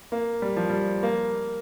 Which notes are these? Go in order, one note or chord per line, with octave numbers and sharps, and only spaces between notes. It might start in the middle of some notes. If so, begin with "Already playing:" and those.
A#3
G3
F3
G3
A#3